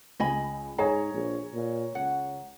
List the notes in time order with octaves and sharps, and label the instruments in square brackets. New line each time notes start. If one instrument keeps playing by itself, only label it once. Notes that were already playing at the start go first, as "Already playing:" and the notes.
[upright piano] C#2 [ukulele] D#5 G#5 B5
[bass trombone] G#2 [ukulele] G#4 [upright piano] C#5 A#5
[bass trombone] A#1
A#2
[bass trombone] C#2 [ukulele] F#5